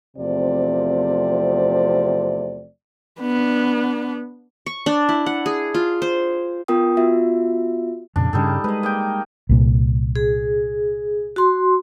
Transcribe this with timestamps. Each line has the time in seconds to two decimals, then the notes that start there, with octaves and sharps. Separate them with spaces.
0.17 E2 C3 F3 A3 C4 D5
3.20 B3 D4
4.66 C#6
4.86 D4
5.09 E4
5.26 F#5
5.46 G#4
5.74 F4
6.02 C5
6.68 B3 F4 A#4 G5 D#6
6.97 B3 F4 F#4 E5
8.16 F2 A#2 C#3 D4
8.33 G2 C#3 G3 D#4 A4
8.64 G#3 B4 D#5
8.83 A#3 D#5 G5
9.49 C2 A#2
10.16 G#4
11.36 F#4 C6